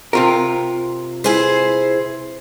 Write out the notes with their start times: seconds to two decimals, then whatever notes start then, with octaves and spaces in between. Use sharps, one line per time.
0.13 C3 F4 A#4
1.24 E4 G#4 C5